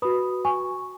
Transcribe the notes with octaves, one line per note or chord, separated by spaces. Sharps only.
F#4 B4 B5 D#6
G#5 C#6